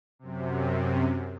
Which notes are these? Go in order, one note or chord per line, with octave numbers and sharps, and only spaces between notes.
F#2 C3